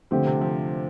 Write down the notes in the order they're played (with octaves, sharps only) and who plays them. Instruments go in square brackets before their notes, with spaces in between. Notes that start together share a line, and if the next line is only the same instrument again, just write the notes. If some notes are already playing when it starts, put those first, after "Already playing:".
[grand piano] D3 A3 C4 G4 [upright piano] F3
[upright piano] C3
F3